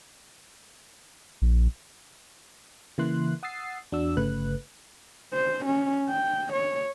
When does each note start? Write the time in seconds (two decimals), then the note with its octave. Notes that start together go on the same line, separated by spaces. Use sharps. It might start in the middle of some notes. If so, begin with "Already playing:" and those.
1.42 A#1
2.98 C#3 E3 A#3 E4 C6 F#6
3.43 F#5 D#6 E6 A6 C7
3.92 E2 D4 F#4 D5 E6
4.17 G1 C#3 A3 B4 F#6
5.34 C5
5.66 C#4
6.09 G5
6.54 C#5